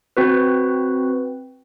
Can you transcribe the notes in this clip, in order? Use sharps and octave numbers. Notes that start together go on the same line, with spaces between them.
C4 F#4 B4